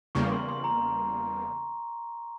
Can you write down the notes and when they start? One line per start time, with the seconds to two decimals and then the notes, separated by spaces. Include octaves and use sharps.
0.15 E2 C#3 G3 A#3 C#6
0.32 C6
0.49 C6
0.64 A#5